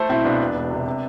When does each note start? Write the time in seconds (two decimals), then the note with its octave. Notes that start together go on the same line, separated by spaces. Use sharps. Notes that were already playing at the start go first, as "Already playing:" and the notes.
Already playing: A3 A4 C5
0.09 B1 C4 E4
0.24 B1 B3 D4
0.40 E1
0.55 E1
0.70 C3
0.86 C3